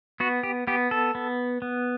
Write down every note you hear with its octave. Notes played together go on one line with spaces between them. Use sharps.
B3 F#4
G4
B3 G4
A4
B3
B3